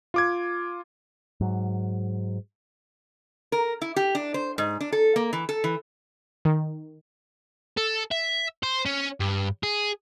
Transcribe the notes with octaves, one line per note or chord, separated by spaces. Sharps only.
F4 D6 G#6
G#2 F#3
A#4
E4
G4
D4
C5
G#2
D4
A4
A#3
E3
A4
E3
D#3
A4
E5
C5
C#4
G2
G#4